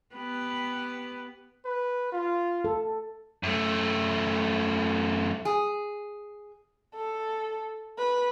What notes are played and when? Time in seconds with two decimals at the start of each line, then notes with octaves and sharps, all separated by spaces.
0.15 B3 G4 B4
1.65 B4
2.12 F4
2.65 A4
3.43 F#2 A3
5.45 G#4
6.95 A4
7.98 B4